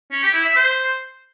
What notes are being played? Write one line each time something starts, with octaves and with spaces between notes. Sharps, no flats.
C#4
G4
E4
E5
C5